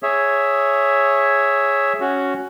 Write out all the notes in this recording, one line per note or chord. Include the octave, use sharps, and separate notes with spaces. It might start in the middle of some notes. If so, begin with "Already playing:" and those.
G#4 C#5 E5
C#4 F#4